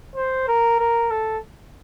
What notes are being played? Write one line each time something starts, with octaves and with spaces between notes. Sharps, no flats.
C5
A#4
A#4
A4